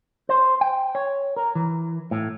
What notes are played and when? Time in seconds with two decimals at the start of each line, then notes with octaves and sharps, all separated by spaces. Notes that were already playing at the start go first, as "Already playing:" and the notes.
0.29 C5
0.61 G5
0.95 C#5
1.36 A#4
1.55 E3
2.11 A2